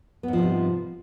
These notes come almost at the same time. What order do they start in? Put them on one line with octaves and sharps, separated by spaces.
B3 G#2 F3 C3 G3